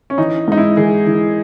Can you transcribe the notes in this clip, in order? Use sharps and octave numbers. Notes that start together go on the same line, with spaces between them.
C#4
E3 D#4
G#2 D#4
E4
E3 G#4
E3